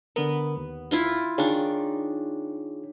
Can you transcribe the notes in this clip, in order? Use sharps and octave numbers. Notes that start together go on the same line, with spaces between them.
D3 B3 A#4
D#2
E4 F4 C6
D#3 D4 F4 G#4 C#5